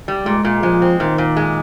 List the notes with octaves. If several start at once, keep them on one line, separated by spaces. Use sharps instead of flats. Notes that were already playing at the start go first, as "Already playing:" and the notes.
G3
A#2 G#3
A#2
F3 G#3
C4
A#2 D#3
A#2
G#3